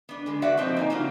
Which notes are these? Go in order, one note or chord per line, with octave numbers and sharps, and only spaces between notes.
B3 D4
D3 G#3
F#4 B4 D5 E5 F#5
B2 F3 A3 C4 D#4 C5
A#3 D#4 G#5
C#3 A#3 C4 D4 F4 F#4